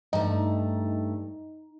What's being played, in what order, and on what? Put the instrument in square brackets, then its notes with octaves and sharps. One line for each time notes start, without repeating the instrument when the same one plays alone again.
[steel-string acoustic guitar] G2 A3 [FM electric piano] D#4